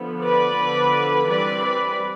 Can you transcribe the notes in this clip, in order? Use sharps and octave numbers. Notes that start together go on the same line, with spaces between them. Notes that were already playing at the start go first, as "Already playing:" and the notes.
Already playing: D3 F3 B3
B4 D5
D3 F3 B3 D4
E3 G3 C4 B4 D5
B4 D5